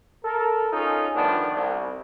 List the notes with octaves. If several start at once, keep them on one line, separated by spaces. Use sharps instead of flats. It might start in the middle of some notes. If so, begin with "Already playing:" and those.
A4 A#4
C#4 D#4 F4 G#4 A4
D3 D#3 F3 A3 B3 D4
C2